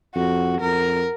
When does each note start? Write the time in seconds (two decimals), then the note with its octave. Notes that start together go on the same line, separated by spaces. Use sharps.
0.15 F2 F#4
0.61 F2 A#4